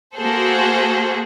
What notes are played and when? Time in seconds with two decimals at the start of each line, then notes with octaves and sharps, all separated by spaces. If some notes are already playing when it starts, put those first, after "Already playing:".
0.16 A#3 F#4 G#4 A4 C5